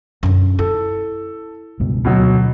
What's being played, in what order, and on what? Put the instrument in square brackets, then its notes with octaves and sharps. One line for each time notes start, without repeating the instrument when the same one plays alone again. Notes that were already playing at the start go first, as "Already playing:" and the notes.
[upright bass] F#2 D3
[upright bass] E4 [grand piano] A4
[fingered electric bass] C#2 G2 B2
[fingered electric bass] D2 [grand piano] B2 F#3